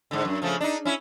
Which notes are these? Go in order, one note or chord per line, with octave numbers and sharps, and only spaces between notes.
G#2 D3
F#2
C#3 F3 A3
D4 D#4
C#4 E4